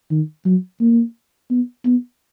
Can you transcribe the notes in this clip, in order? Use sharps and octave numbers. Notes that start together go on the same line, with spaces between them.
D#3
F#3
A#3
B3
B3